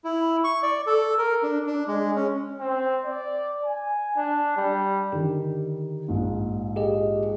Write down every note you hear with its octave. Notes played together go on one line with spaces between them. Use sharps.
E4
C#6
D5
A4
A#4
D4
D4
G#3
C#4
C4
D5
G#5
D4
G3
D3 D#3 G4
A#1 G#2
G4 G#4 D#5